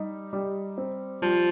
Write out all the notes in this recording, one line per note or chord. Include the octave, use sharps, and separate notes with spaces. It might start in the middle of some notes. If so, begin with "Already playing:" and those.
Already playing: G3 D#4
G3
C4
F3 G3